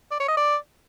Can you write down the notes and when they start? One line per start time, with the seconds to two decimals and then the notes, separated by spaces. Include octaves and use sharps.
0.11 D5
0.20 C#5
0.28 D#5
0.37 D5